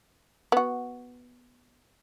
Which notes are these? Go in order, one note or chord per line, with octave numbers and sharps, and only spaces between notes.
B3 F#4